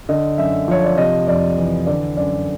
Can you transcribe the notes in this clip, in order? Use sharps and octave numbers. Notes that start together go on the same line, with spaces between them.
D3 D#5
F#2 E5
F3 C#5
D5
C3 D#5
F2 D5
E3
D3 D5
F#2 D5